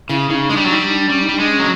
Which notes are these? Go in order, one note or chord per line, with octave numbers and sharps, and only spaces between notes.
C#3 E4
C#3 D#4
G#3 D4
G3
F#3
G3 D#4
D4
G3 C#4
D#4
G3 D4
G#3
C#4
F#3